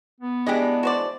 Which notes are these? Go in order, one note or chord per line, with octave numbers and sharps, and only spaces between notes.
B3
E3 G#3 D4 G4 G#4 D#5
F#4 C5 D5